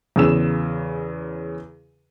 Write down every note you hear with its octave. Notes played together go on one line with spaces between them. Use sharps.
E2 C#3 E6 E7